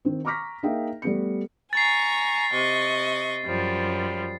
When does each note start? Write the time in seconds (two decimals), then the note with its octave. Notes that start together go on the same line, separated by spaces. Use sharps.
0.05 D#3 C4
0.25 A#5 C#6 D6 F6 A#6 B6
0.63 A#3 D#4 G#4 E5 G5
1.02 G3 A3 B3 C#7
1.73 G#5 A#5 C#6 A6 C7
2.52 C3 D#5 C#6
3.45 F#2 F3 G3